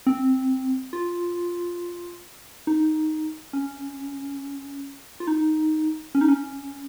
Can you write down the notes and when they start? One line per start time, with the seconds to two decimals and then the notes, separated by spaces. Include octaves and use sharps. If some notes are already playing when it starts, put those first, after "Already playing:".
0.07 C4
0.93 F4
2.67 D#4
3.53 C#4
5.20 F4
5.27 D#4
6.15 C#4
6.21 D#4
6.28 C#4